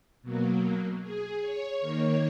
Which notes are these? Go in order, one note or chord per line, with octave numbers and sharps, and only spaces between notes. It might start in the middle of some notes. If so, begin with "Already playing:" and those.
B2 F#3 A#3
G#4
C#5
D#3 A#3